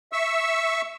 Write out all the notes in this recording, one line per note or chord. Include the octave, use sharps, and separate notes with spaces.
E5 C#6 E6